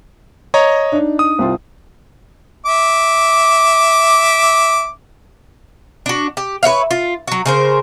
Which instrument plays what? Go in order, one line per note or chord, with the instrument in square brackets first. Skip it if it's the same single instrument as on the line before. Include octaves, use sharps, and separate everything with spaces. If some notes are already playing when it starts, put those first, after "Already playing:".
[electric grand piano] C#5 D#5 A#5
[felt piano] D4 D#4
[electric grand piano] D#6
[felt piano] C2 C4 F4
[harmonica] E5 D6
[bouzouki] D4 F#4
G4
B4 C#5 E5 F5
F4
F#3 F#4
C#3 A#4 C5